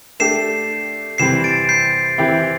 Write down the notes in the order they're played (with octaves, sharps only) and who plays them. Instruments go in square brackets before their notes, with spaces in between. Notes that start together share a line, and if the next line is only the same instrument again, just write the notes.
[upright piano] A3 D4 G4 [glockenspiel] C7 E7
[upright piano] C3 E3 G3 C4 [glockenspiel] C7 E7
[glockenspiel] A6 D7
G6 C7
[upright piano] E3 C4 E4 G4